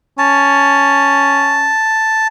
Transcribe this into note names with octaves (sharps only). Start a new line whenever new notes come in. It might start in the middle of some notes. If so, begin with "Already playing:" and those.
C#4 A5